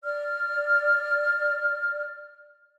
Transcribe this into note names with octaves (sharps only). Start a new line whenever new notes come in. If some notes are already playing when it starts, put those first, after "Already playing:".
D5 F6